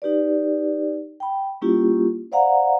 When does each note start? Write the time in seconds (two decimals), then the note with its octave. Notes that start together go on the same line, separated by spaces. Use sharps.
0.02 D#4 G4 B4 D5
1.20 G5 B5
1.62 G3 A#3 C#4 E4 F4 G4
2.32 C5 D5 F5 F#5 A#5